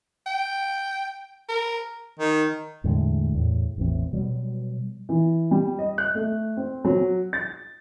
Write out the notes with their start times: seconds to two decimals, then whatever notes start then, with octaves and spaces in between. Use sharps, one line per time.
0.27 G5
1.49 A#4
2.20 D#3
2.84 E2 A2 D3 G#3
3.34 E2 A2
3.78 A1 E2 E3 C4
4.13 B2 F#3 G3 B3
5.09 E3
5.51 G3
5.79 D#5
5.98 F#6
6.15 A3
6.57 C4
6.85 F#3
7.33 A6